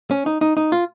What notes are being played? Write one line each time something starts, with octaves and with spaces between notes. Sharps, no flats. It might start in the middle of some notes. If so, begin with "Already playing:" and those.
C#4
D#4
D#4
D#4
F4